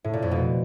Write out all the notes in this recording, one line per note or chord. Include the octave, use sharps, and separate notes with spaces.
A2
A#2
F2
B2